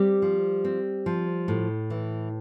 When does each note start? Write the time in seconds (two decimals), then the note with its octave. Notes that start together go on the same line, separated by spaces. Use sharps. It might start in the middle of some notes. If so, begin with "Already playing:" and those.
Already playing: G3 C4 G4
0.22 F3
0.65 C4
1.06 F3
1.48 A2
1.90 E3